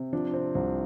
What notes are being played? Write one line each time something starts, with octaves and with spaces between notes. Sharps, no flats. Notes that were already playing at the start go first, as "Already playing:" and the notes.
Already playing: C3
F3 D4
C3 C4
C2 C4